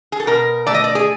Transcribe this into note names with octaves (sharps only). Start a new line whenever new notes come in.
G#4
A4
B2 A#4
A3 D5
D#5
D5
G#4